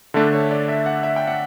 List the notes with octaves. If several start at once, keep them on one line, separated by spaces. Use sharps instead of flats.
D3 A3 D4 E5
C#5
D5
E5
F#5
E5
G5
F#5